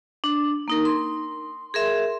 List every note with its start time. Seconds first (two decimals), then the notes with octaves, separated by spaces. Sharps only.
0.24 D4
0.68 A#3 D#4 A#4
0.85 C6
1.74 G#4 A#4 E5 C6